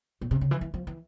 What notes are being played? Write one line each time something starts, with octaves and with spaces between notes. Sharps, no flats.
A#2
C3
C#3
E3
E3
F3
E3